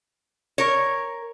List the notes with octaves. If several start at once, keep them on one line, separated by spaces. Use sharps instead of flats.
A#4 C#5